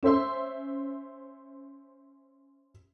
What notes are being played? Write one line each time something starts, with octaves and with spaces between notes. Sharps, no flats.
C#4 C5 E5 C6